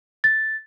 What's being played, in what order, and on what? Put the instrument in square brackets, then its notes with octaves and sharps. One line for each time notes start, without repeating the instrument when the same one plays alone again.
[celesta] A6